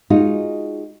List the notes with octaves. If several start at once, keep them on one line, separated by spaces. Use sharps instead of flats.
G#3 D#4 F4 F#4